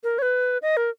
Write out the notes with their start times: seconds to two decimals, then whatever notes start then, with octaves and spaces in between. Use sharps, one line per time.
0.04 A#4
0.19 C#5
0.22 B4
0.62 D#5
0.77 A#4